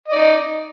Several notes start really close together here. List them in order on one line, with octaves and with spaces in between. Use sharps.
D#5 D5 D#4